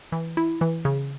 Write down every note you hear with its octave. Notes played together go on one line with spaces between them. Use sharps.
E3
E4
E3
C#3